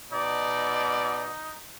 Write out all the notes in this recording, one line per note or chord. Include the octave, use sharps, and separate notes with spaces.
B2 D#4 D5